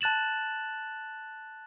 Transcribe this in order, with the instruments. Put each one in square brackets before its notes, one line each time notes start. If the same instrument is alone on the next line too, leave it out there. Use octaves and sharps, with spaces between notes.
[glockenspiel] A5 F#6 A6 E7 F#7